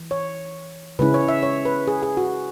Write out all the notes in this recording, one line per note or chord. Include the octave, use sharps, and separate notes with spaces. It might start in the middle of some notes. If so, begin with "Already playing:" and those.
Already playing: E3
C#5
C#3 G#3 C#4 E4 B4
C#5
E5
C#5
B4
G#4
G#4
F#4